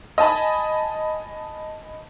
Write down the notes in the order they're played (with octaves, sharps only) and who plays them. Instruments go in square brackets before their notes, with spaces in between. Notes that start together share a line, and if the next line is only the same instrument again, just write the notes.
[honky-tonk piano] D#5 G#5 A5 B5